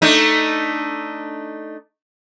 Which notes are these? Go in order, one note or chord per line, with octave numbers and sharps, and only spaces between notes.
A3 D4 D#4